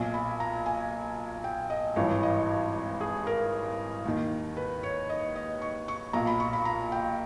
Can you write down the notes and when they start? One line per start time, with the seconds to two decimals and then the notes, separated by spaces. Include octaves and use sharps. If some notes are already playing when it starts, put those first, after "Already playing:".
Already playing: B1 A#2 G#5
0.14 B5
0.40 A#5
0.66 G#5
1.44 G5
1.70 D#5
1.96 G#1 G2 E3 C#5
2.23 D#5
3.01 G#4
3.27 A#4
4.06 D#2 D#3
4.57 B4
4.83 C#5
5.10 D#5
5.36 D#5
5.62 C#6
5.88 C#6
6.13 B1 A#2 A#5
6.27 B5
6.40 C#6
6.53 B5
6.65 A#5
6.92 G5